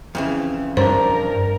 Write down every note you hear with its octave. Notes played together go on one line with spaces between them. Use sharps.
F2 C#3 E3
G2 C#4 D4 A#4 C5